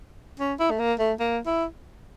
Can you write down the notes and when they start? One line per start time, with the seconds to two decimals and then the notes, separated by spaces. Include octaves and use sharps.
0.40 C#4
0.60 E4
0.71 A3
0.80 A#3
1.00 A3
1.20 A#3
1.46 E4